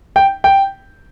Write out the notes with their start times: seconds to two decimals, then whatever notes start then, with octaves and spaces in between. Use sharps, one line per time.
0.16 G5
0.44 G5